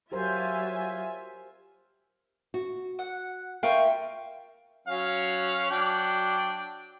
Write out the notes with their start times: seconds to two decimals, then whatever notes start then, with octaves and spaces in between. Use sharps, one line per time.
0.12 F#3 F4 G4 A#4 C5 E5 G#5
2.54 F#4
2.99 F#5
3.63 F4 A#4 E5 F5 G5 C#6
4.88 F#3 C#4 F5
5.70 F#3 D4 G5